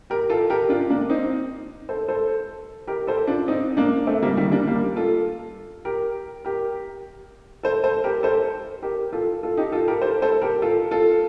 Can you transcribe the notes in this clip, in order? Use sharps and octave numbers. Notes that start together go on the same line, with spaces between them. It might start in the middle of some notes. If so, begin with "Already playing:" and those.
G4 A#4
F4 A4
G4 A#4
D4 F4
A#3 D4
C4 D#4
A4 C5
A4 C5
G4 A#4
A4 C5
D4 F4
C4 D#4
A#3 D4
A3 C4
G3 A#3
D#3 G3
A#3 D4
G3 A#3
F4 A4
G4 A#4
G4 A#4
A4 C5
A4 C5
G4 A#4
A4 C5
G4 A#4
F4 A4
F4 A4
D#4 G4
F4 A4
G4 A#4
A4 C5
A4 C5
G4 A#4
F4 A4
F4 A4